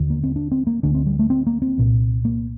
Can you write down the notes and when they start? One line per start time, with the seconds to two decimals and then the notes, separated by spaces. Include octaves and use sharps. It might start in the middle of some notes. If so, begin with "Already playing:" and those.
Already playing: D#2 D3
0.10 A#3
0.23 C4
0.36 D4
0.52 C4
0.67 A#3
0.83 D2 D3 D4
0.95 C4
1.07 G3
1.19 A3
1.30 C4
1.47 A#3
1.62 C4
1.78 C2 A#2
2.25 A#3